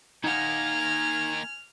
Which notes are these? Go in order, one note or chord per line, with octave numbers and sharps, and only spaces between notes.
D#3 A#3 D#4 F#5 G#5 F6